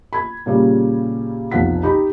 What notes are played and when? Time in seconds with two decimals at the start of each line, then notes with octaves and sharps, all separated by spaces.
0.13 B5 G#6
0.46 A#2 C#3 G3 C#4
1.51 F1 B1 F4 F#5 B6
1.83 D#4 G4 B5